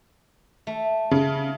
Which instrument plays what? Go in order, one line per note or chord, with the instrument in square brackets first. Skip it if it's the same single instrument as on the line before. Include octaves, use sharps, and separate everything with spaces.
[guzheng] A3
[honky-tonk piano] C#3